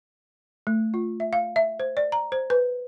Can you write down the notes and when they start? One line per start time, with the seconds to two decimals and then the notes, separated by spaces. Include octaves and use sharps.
0.67 A3
0.94 F4
1.20 E5
1.33 F5
1.56 E5
1.80 C5
1.97 D5
2.12 A#5
2.32 C5
2.50 B4